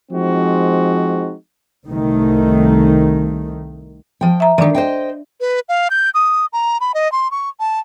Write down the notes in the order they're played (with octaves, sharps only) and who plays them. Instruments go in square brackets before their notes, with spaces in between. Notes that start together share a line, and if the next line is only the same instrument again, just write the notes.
[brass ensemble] F3 G#3 C4 D#4 F#4
[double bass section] C2 D#3 A3
[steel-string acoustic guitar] F3 G5
[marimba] E5 A#5
[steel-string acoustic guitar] D#3 F3 [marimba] D4 D5
[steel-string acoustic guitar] C5 D#5 G5
[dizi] B4
F5
G6
D#6
A#5
B5
D#5
C6
C#6
A5